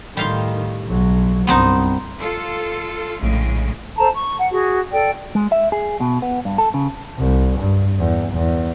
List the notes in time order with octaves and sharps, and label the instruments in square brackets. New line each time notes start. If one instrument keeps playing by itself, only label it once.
[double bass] A2 D#3 [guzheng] G3 F5 C6
[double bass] B1 F#3
[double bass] C2 G2 [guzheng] B3 C4 D#4
[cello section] F4 A4
[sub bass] A#1 [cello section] A2 C#3 G#3
[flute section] A4 C5 A5 A#5
C#6
F#5
F#4 G#4
A4 D5 G5
[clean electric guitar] G#3
E5
G#4
B2
B3
G2
A4
C#3
[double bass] C2
G2
E2
E2